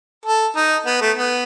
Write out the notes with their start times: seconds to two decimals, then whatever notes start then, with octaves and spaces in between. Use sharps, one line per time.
0.26 A4
0.56 D#4
0.86 B3
1.01 A3
1.17 B3